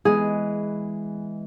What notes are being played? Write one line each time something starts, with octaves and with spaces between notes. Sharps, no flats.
E3 G#3 B3 G#4